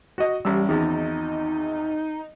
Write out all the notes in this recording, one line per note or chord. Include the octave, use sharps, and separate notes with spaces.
F#4 D#5
A1 G3 E6
G#1 E2 D#4